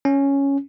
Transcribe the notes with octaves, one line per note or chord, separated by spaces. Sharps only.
C#4